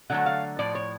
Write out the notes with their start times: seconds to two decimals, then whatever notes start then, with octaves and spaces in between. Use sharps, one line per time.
0.10 D3 F#3 A3 F#5
0.26 F5
0.59 A2 F3 D5
0.75 C#5